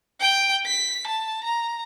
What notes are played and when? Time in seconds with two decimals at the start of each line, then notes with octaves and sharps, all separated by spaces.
0.21 G5
0.66 B6
1.07 A5
1.44 A#5